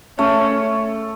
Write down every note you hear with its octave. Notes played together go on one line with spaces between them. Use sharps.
A3 C#4